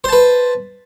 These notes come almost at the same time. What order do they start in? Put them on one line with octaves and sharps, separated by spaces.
C5 A5 B4